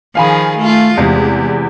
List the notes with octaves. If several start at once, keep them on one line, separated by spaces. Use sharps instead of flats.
D#3 F3 G#4 F5 G#5 B5
A3 F4
E2 C3 G#3